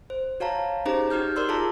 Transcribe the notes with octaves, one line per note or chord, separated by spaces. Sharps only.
C5
F#4 C#5 F5 A5 A#5
C#4 D#4 G4 G#4 C5 A#5
D#4 F#4 G4 F6 G6
A#4 D5 C6 E6
F4 G#4 D5 A5 A#5